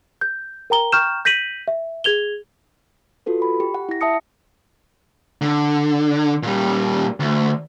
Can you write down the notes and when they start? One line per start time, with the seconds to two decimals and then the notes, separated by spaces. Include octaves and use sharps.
0.21 G6
0.70 A#4 G5 A#5 G7
0.92 G5 A#5 C#6 F6 G6 E7
1.25 G6 A#6 B6 D#7 F#7
1.68 E5
2.04 G#4 G#6 F7 G7
3.26 F4 F#4 A4 B4
3.42 B5
3.60 G4
3.74 F#5
3.89 E4 A#6
4.01 E5 A5 D#6 C#7
5.41 D3
6.43 A#2 G3
7.20 D2